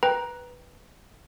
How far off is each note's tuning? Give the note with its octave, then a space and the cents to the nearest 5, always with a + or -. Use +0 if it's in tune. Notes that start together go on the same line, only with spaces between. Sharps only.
B4 +0 G5 +0 A#5 +15